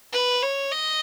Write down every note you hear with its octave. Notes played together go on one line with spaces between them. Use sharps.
B4
C#5
D#5